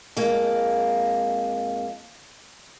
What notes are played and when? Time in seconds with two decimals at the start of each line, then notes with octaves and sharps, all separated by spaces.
0.17 F2 G#3 A#3